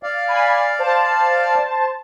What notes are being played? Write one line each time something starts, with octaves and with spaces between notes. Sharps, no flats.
D5 F5
G#5 B5
C5 A5